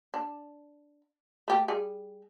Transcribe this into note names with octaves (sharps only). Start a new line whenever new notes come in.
D4
A3 G4
G3 G#4